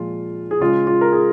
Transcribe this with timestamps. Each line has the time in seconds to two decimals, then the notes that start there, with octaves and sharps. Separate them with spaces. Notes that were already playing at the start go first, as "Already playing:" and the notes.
Already playing: A#2 F3 G#3 F4
0.51 G#4
0.60 C#3 G#3 F4
0.87 F4
1.01 A#4
1.12 G#4